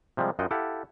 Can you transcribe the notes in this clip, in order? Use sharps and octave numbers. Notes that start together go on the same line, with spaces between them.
C3 F3 G3 G#3
F#2 F4 D#5 F#5 G5
E4 G4 A4 F5 F#5 A5